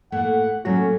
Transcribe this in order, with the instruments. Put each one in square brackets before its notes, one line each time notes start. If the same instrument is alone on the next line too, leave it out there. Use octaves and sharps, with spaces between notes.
[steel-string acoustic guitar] A2 A3 A#3 [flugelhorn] F#5
[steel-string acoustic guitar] A2 A3 A#3 [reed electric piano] F#3 F#4 [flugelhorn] C#4